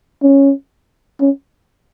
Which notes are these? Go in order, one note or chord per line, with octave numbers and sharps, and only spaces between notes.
C#4
C#4